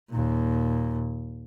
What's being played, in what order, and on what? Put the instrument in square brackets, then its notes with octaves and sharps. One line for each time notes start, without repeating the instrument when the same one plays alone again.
[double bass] D#2 A#2